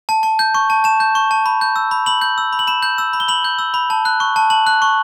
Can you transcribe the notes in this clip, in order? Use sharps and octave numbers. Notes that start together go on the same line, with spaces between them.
A5
A5
G6
C#6
A5
A5 E7
G6
C#6
A5
B5
G6
E6
B5
B5 F#7
G6
E6
B5
F#7
B5 E7
G6
E6
B5
G7
B5 F#7
G6
E6
B5
A5
F#6
C#6
A5
A5 F#7
F#6
C#6